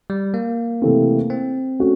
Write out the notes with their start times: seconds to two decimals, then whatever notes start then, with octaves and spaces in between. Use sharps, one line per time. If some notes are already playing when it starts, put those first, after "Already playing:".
0.10 G3
0.34 A#3
0.82 C3 E3 A3 C4
1.30 C4
1.79 A3 C#4 F#4